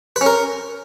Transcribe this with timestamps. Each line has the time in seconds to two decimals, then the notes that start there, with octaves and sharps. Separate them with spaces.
0.16 B4
0.21 C#4
0.26 A#4